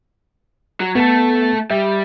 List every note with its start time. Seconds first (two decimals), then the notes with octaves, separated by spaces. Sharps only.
0.80 F#3
0.95 A3 B3 A4
1.71 G3 E5